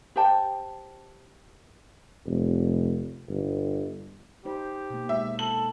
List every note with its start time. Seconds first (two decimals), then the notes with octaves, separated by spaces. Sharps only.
0.16 G4 C5 G5 A5
2.26 F1
3.29 G1
4.45 D#4 G4 C5
4.90 B2 A#3
5.09 G#3 A#3 E5
5.39 A4 F#7